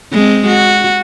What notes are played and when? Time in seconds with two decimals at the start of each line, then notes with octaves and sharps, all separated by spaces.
0.13 G#3 C4
0.47 F#4